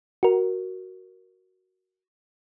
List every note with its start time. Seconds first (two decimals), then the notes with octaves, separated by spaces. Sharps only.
0.23 F#4 A#4